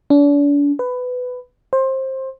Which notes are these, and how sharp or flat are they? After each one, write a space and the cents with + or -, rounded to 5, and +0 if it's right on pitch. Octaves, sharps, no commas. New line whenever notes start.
D4 -40
B4 +15
C5 +20